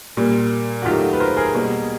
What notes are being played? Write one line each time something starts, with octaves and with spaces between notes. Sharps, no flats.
A#2 G3 A#3
F#4
D#3 F#3 A3 F4 G4
B4
A#4 C5
G#4 A#4
B2 G3 A#3